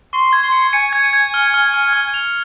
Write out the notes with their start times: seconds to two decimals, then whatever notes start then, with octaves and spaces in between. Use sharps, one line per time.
0.13 C6 C#6
0.33 G#6
0.43 C6
0.52 C#7
0.73 G#5 C#7
0.93 G#6
1.03 G#5
1.13 G#6
1.34 F6
1.54 F6
1.74 F6
1.93 F6
2.14 F7